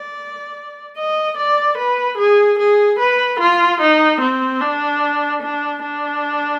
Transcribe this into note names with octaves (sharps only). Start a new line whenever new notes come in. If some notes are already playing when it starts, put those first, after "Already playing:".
Already playing: D5
D#5
D5
B4
G#4
G#4
B4
F4
D#4
C4
D4
D4
D4